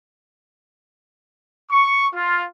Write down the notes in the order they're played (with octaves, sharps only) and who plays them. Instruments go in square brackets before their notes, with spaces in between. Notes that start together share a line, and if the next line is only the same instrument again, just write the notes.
[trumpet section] C#6
F4